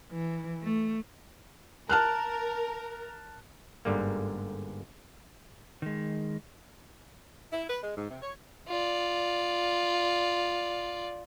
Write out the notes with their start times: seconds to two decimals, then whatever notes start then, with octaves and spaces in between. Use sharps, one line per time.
0.11 E3
0.62 A3
1.90 A#4 A5 F6 F#6
3.85 G1 G#2 D3 G3 A#3
5.82 D#3 G#3
7.52 E4
7.69 B4
7.82 G#3
7.96 G#2
8.10 C3
8.22 C#5
8.68 F4 D5